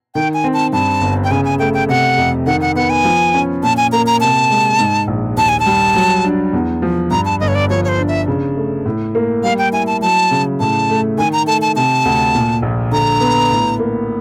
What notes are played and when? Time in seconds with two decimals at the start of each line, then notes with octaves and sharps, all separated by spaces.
0.15 D#3 G5
0.34 G#5
0.44 C4
0.54 A5
0.73 G2 A5
1.01 G1
1.24 G5
1.31 C#3 G#5
1.45 G#5
1.59 A3 G5
1.74 G5
1.89 C3 F#5
2.18 F2
2.46 D#3 F#5
2.61 F#5
2.76 B3 F#5
2.90 G#5
3.04 F3
3.34 C#4
3.63 A#2 A5
3.77 G#5
3.92 A#3 A#5
4.07 A#5
4.20 C3 A5
4.50 G#3
4.79 G#2
5.08 A#1
5.37 D#2 A5
5.49 G#5
5.60 A5
5.66 G3
5.95 F#3
6.24 D4
6.53 E2
6.82 F3
7.11 G2 A#5
7.25 A5
7.40 G1 D#5
7.48 C#5
7.55 D5
7.70 F3 C#5
7.84 C#5
7.88 C5
7.98 D4
8.08 E5
8.27 C#3
8.57 A3
8.86 A2
9.15 A#3
9.43 G3 F5
9.59 G5
9.73 E4 G#5
9.87 A5
10.02 F#3 A5
10.31 C#3
10.60 A2 A5
10.89 A3
11.17 D#3 G#5
11.33 A#5
11.46 A3 A5
11.62 A5
11.76 C3 A5
12.05 D2
12.35 A#2
12.62 A#1
12.91 D3 A#5
13.21 B3
13.51 A2
13.79 A#3